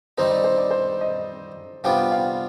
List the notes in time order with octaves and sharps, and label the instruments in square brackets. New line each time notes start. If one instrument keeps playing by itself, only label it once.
[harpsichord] D#3 G3 C4 D#4 [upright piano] C5
[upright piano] D5
C5
D5
C5
D#5
[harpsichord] C3 G3 B3 D4 F4 [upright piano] G5
[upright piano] F5